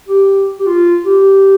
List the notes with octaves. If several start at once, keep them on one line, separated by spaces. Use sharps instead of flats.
G4
G4
F4
G4